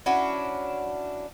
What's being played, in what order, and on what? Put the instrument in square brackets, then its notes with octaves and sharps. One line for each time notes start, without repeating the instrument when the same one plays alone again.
[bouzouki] C#4 D4 E4 F#4